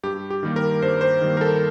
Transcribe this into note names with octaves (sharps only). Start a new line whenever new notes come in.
G2 G4
G4
D#3 G3 A#3
A#4
G2 C5
C5
D#3 G3 A#3
A#4
A4